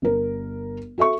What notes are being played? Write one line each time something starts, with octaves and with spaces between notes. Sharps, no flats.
G1 A#4
F#4 A4 E5 C#6